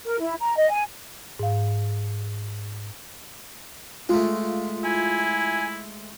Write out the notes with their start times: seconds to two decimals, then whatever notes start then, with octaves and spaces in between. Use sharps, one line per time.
0.06 A#4
0.20 E4
0.40 A#5
0.57 D#5
0.70 G#5
1.39 G#2 F5
4.09 G#3 A3 F4
4.84 E4 G#5